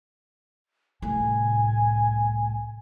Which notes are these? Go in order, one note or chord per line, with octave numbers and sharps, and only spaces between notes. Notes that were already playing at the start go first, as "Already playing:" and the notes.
C2 A2 G#5